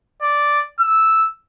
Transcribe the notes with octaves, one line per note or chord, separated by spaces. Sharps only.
D5
E6